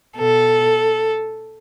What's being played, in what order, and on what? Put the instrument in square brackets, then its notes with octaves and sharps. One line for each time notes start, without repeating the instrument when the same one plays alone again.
[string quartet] B2 A4